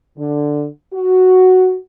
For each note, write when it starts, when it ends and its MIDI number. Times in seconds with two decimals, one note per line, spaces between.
0.18 0.66 50
0.94 1.76 66